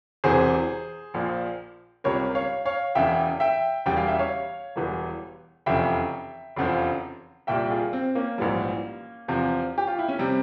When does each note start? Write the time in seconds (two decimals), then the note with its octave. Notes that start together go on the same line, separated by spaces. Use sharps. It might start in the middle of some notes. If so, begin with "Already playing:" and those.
0.24 E1 E2 C3 E3 G#4 C5
1.14 A#1 A#2 F3
2.04 C#2 C3 G3 A#4 C#5
2.35 C#5 F5
2.65 C#5 F5
2.95 E1 E2 C#3 E5 G5
3.40 E5 G5
3.86 E1 E2 C#3 G3 G5
3.97 F5
4.08 E5
4.19 C#5 F5
4.76 E1 E2 E3 G3
5.66 F1 E2 C#3 E5 G5
6.57 F1 E2 C#3 F3
7.47 C2 A#2 G3 E5 G5
7.71 F4 G#4
7.93 C4
8.15 A#3 C#4
8.38 A#1 G#2 E3 G3
9.28 E2 C3 F3
9.78 G4
9.87 F4
9.99 E4
10.09 C#4
10.19 C3 G3 C4